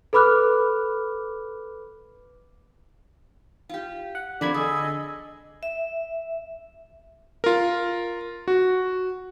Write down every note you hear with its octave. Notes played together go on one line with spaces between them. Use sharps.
A4 B4 B5 D6 F6 F#6
F4 G4
F#5
D3 F3 C4 A#4 D5 B5 G#6
G#4 A4 D#5 G#5 E6
E5
F4 A#4
F#4